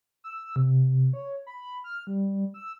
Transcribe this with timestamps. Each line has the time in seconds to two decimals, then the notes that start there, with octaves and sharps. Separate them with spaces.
0.24 E6
0.56 C3
1.13 C#5
1.47 B5
1.84 F6
2.07 G3
2.54 E6